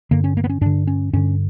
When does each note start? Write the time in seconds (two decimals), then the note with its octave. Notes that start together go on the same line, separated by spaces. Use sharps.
0.11 G2 D3 A#3
0.24 C#4
0.37 A#3
0.44 B3
0.49 C#4
0.61 G2 D3 D4
0.87 C#4
1.13 G2 D3 C#4